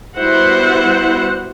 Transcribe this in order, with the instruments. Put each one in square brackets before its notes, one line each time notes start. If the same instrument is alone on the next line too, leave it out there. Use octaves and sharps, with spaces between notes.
[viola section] G3 B3 E4 F#4 C5 F#5